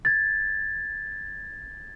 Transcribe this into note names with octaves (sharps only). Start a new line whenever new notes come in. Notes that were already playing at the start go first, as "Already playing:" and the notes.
G#6 A6